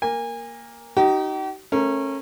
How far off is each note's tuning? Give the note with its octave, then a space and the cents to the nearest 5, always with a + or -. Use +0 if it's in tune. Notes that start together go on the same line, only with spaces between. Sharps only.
A#3 +0 G#5 -30
D#4 +0 G4 -45
A3 +5 C#4 -25 A#4 +0